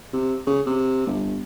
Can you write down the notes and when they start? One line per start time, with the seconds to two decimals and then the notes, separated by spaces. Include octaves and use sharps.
0.13 C3
0.47 C#3
0.66 C3
1.07 G1